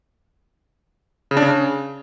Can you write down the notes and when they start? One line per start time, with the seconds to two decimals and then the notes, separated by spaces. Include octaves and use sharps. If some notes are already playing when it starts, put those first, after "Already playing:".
1.31 C#3
1.37 D4
1.42 C#3